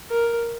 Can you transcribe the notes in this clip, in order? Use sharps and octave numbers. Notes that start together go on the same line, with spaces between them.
A#4